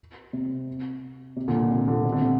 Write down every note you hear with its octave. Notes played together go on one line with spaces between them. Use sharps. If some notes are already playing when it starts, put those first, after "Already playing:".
C3
C3
A#2 D3
A#2
C3
A#2 D3
C3
D3
C3